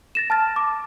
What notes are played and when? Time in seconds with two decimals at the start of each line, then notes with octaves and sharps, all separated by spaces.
0.15 A6 A#6 E7
0.30 A5 F6 A6
0.56 D6